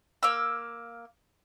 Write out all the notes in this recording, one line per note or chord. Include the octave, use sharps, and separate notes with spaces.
A#3 F5 E6